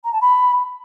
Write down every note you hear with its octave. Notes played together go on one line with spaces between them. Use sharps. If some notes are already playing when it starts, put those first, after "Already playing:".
A#5
A5
B5